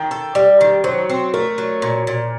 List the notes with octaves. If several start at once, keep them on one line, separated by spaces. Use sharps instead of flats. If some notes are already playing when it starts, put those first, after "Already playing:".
Already playing: D#3 G5
A4
G3 D5
D#3
F#3 C5
C4
A3 A#4
F#3
A#2
A#2